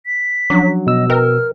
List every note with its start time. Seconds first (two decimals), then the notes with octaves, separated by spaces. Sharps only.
0.06 B6
0.50 F3 F#3 C#4 D4
0.87 B2 D#5 E6
1.10 A#4 B4 D#5 G5 F6